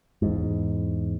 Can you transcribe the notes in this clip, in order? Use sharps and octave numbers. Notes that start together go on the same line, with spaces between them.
E2 G#2